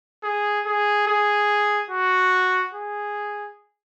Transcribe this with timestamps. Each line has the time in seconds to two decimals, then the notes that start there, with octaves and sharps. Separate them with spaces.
0.24 G#4
0.66 G#4
1.07 G#4
1.91 F#4
2.74 G#4